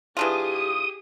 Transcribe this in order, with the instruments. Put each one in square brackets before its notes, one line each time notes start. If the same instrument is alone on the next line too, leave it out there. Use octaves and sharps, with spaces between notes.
[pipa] E3 D4 F4 [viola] G4 G#4 [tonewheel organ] D#6